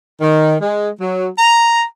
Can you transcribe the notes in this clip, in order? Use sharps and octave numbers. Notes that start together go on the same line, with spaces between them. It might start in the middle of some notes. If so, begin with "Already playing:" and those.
D#3
G#3
F#3
A#5